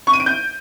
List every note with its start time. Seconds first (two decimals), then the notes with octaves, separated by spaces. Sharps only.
0.07 C#6
0.13 D#7
0.20 D7
0.26 G6